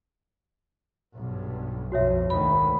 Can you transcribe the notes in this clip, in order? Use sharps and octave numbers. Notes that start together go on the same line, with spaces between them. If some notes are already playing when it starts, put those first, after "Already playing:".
B1 G2
B1 F2 F#4 C#5 E5
D2 G#2 D#3 B5